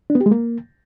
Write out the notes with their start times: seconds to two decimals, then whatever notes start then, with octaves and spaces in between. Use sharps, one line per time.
0.10 D4
0.15 B3
0.21 G4
0.26 G#3
0.31 A#3